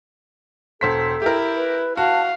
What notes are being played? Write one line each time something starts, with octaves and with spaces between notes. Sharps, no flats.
E1 A4 C5 B6
E4 G4 A#4
B4
F#4 F5 A5